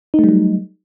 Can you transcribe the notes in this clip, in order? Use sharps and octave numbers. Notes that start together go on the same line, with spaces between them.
F#3 G3 A3 D#4